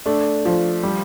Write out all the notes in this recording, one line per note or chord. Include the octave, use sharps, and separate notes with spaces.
A3 D4
F3
G3